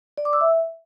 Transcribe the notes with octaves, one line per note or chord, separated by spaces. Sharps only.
D5
D6
E6
E5